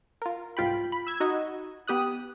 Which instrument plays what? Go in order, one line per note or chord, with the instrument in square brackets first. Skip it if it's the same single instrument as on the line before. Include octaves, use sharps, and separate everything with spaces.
[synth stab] F4 A#4
C2 G#2 F4 G5 B5
B5
E6 G#6
D#4 F#4 D#5
B3 G4 D#6 F#6